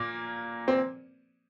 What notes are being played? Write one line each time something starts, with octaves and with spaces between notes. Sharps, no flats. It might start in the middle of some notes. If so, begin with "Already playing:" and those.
Already playing: A#2 A#3
C4